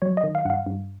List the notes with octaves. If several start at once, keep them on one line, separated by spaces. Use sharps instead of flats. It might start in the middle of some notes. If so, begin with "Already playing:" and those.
F#3 C#5
D#5
D#3
F5
G2 F5 F#5
G2